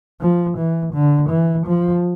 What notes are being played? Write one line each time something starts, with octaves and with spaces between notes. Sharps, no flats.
F3
E3
D3
E3
F3